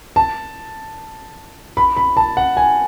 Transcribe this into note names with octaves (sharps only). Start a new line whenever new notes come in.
A5
B5
B5
A5
F#5
G#5